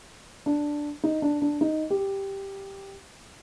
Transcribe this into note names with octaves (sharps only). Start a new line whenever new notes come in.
D4
D#4
D4
D4
D#4
G4